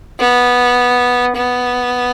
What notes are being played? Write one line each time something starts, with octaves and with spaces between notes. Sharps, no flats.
B3
B3